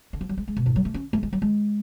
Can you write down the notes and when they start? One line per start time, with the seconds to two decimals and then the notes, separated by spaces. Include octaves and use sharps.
0.13 D3
0.21 F3
0.29 F#3
0.37 G#3
0.48 G#3
0.57 B2
0.66 G#2
0.76 F#3
0.85 A3
0.94 C#4
1.13 A3
1.23 G#3
1.33 F#3
1.42 G#3